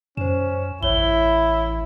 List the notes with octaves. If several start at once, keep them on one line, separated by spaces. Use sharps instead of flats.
F#2 C#4 C5 E7
A1 E4 C#5 G7